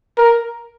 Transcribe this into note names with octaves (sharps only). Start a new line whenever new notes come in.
A#4